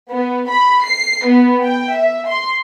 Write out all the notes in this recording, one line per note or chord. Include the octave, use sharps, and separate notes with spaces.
B3
B5
C7
B3
G5
E5
C6